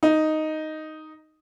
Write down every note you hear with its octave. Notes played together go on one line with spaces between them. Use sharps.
D#4